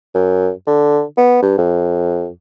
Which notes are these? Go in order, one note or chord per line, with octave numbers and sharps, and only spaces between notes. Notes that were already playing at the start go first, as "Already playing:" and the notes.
F#2
D3
B3
G2
F2